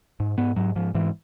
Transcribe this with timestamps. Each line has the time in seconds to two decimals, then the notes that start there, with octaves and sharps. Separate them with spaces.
0.20 G#2
0.38 G#2 B3
0.56 G#2 F#3
0.76 G#2 F3
0.95 G#2 E3